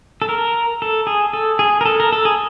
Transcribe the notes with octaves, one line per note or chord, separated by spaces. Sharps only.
A4
A#4
A4
G#4
A4
G#4
A#4
A4
A#4
A4
G#4